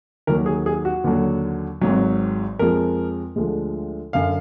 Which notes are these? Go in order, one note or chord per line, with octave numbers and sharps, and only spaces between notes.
D#2 D#3 F#3 A#4
G#4
G#4
F#4
D#2 D3 F#3
G#1 G#2 F#3
F2 F3 G#3 A#4
D2 D3 F3 G#3
F#2 D3 F5